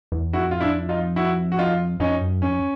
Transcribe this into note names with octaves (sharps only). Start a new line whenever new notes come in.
E2
F2 E4 F#4
F4
D4 E4
D#4 F4
E4 F#4
F#4
D#4 F4
F2 C#4 D#4
F#2
F2 C#4